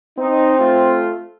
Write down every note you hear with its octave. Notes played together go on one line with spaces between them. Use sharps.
C4 D#4
A3 F4